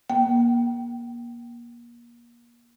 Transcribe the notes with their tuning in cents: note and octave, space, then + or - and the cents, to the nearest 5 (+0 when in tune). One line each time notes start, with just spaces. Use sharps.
A#3 +30 G5 -20